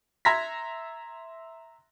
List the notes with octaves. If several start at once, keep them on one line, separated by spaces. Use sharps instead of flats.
E5 A#5 C6 G#6 A#6 B6